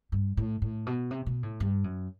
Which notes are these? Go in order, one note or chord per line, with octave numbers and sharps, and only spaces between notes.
G2
A2
A2
B2
C3
B2
A2
G2
F#2